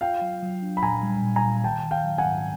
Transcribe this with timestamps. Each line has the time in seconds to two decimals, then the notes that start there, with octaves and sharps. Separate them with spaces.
0.01 F4 F5 G5
0.21 F#3
0.42 F#3
0.63 D4
0.77 B5
0.82 A#2 G#5 A#5
1.03 G3
1.23 A#2
1.36 G#5 A#5
1.43 A#2
1.64 D#3 G5 A5
1.84 D#3
1.91 F5 G5
2.04 F#3
2.18 F#5 G#5
2.25 G#2